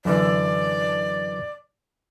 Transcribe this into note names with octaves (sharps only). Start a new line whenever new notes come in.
F#2 D3 E3 D5